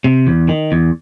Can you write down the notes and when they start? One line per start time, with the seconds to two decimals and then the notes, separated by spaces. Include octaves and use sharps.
0.04 C3
0.27 E2
0.49 D#3
0.72 E2